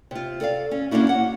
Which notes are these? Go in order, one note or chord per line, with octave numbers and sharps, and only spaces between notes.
C3 F4
A4 D5 F5
C#4
A#3 C#4 D4 E4 F#4
F#5